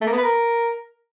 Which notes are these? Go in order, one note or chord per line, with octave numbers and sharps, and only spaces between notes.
A3
A#3
B3
B4
A#4